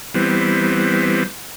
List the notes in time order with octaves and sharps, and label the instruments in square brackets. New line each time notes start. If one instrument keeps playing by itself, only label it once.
[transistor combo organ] E3 G3 B3 C4